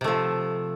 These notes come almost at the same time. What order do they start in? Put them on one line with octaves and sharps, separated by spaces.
C3 A3 F3